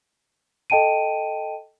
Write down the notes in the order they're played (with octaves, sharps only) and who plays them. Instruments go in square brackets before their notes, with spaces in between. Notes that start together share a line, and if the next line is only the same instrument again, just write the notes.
[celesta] A4 D#5 G5 A5 D7 D#7